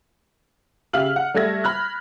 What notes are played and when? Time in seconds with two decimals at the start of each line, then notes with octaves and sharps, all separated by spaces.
0.93 C#3 G4 E5 F5 F6 F#7
1.16 F#5
1.34 G3 A3 E5 G#6 A#6
1.64 B5 F6 F#6